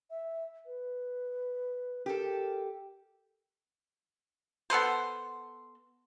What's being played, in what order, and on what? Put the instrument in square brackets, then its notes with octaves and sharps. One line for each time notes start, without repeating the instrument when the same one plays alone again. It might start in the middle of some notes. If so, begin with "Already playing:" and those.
[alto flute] E5
B4
[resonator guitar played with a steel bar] G4 A4 [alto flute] A#4
[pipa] B3 A4 B4 C5